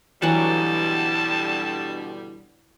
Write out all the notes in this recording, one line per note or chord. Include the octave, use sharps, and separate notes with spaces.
B2 D3 E3 F#3 G3 F#5 A5